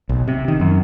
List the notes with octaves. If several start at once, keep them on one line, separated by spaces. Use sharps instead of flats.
B1
C3
D#3
F#2